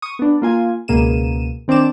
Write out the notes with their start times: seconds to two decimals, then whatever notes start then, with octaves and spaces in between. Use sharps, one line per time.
0.02 C#6 D#6
0.19 B3 D4
0.42 A#3 F4 G#5
0.88 C#2 B2 A#3 G#4 D#7 E7
1.68 D#3 C4 D4 D6 E7